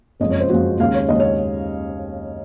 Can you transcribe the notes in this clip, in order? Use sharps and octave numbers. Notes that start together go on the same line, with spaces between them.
F#1 F2 C#3 F3 G#3 D#5
C#5
C5
F#1 F2 C#3 F3 G#3 F#4
D#2 C#3 G#3 F5
C#5
D#2 C#3 G#3 D#5
C#5